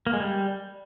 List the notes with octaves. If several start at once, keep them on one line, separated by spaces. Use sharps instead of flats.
A#3
G#3
G3